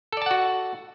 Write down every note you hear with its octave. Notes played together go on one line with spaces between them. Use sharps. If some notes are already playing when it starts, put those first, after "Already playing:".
F#4 A4 D5 F#5 A5